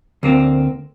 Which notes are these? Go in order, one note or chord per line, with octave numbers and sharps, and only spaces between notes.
D2 A#3 C4